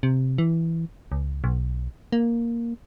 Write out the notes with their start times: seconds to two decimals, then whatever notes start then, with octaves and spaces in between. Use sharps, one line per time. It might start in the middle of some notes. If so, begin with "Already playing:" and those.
0.03 C3
0.38 E3
1.12 C#2
1.44 B1
2.12 A#3